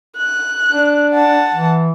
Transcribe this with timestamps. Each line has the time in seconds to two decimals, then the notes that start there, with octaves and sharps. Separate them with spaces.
0.17 F#6
0.71 D4
1.14 F#5 A5
1.54 E3